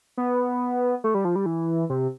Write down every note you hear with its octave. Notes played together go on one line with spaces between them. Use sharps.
B3
A3
G3
F3
G3
E3
C3